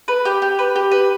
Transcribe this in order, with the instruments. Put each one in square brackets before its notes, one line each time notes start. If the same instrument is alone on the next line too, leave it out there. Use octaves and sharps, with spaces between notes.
[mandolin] B4
G4
G4
B4
G4
B4